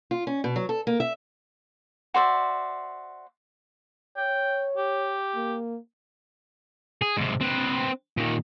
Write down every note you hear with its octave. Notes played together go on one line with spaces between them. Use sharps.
F4
C#4
B2
F#3
A4
A#3
E5
F#4 C5 D5 E5
C#5 G5
G4
A#3
G#4
G#2 C3
C4 B4
A#2 D#3